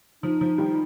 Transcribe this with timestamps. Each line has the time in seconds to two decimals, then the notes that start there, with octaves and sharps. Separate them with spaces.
0.23 F3 D#4
0.41 F3
0.58 D#3 G3